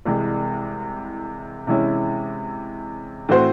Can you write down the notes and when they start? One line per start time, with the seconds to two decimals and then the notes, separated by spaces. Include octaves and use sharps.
0.05 C2 C3 E3 G#3
1.67 C3 E3 G#3 C#4 E4
3.29 A2 E3 C4 F#4 C5